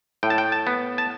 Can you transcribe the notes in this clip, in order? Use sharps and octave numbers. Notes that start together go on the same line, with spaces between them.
A2 G5
A5
G5
A5
B3
A5